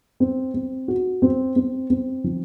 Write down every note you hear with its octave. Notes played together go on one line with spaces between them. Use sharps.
C4
C4
F#4
C4
C4
C4
F3